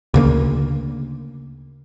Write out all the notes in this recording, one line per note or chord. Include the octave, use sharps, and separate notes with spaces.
D2 C#3 A#3